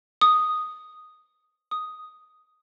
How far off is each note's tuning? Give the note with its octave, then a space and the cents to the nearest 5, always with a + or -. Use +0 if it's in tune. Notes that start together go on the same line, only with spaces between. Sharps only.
D#6 -5
D#6 +0